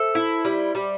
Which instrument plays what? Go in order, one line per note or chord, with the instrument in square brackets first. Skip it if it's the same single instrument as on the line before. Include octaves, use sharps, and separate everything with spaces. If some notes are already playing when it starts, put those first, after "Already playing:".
Already playing: [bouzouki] A4 [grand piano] C5 E5
[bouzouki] E4
G3
G3